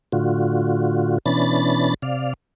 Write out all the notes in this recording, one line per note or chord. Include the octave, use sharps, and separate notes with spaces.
A2 D3 F4 F#4
B2 E3 C#4 D4 B5 A6
C3 D5 F5